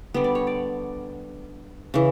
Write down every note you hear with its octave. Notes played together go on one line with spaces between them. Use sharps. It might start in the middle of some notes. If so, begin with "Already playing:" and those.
D3 G3 B3
D5
C#5
D5
C#3 E3